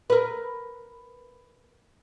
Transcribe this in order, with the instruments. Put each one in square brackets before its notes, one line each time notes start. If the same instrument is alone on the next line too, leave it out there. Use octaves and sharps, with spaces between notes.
[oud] A#4 B4